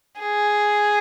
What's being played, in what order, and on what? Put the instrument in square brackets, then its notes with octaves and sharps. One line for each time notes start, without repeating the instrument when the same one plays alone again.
[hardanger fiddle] G#4